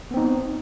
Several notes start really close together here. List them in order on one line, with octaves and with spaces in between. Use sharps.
B3 C4 D#4